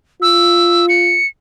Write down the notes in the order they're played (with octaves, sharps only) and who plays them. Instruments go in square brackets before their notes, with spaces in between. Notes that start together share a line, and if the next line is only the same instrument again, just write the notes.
[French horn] F4 [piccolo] E6
[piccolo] C#7